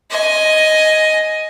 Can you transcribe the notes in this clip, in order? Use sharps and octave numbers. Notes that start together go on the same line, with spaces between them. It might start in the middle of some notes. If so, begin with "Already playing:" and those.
D#5 G#5